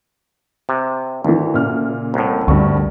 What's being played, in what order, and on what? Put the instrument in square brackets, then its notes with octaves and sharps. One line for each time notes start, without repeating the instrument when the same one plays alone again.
[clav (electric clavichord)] C3
[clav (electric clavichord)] D2 [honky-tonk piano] D#3 E3
[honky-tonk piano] A#2 C#3 F6
[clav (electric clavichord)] C2 A2
[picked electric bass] D2 [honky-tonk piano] G2 C#6